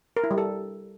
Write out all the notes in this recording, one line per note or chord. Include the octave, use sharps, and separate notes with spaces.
A#4
E4
G3
A4